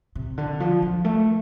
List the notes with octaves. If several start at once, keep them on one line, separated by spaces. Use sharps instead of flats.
C3
D3
F3
F3
A3